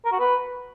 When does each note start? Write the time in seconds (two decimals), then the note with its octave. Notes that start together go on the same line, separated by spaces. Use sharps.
0.05 A#4
0.12 F#4
0.19 B4